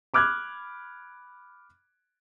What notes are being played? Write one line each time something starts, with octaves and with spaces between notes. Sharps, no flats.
B5 D6 F6 F#6 G#6